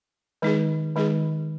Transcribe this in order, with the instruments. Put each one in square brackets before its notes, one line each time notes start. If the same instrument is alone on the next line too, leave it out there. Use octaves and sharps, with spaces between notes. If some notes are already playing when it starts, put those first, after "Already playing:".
[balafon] D#3 G#3 D#4 G#4
D#3 G#3 D#4 G#4